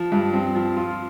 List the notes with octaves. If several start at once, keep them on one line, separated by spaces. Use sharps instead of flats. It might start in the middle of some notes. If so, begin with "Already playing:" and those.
Already playing: F3
G2
C4
F3
F4